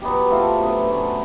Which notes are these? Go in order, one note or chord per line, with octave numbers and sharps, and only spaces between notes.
F#3 B3 D#4 G4
A3 C4 F4 A4
F#3 B3 D4
F#3 A3 C#4